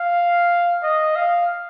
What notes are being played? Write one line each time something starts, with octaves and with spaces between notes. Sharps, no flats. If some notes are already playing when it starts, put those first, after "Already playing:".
Already playing: F5
D#5
F5